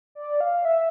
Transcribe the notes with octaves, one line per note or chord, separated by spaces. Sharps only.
D5
F5
E5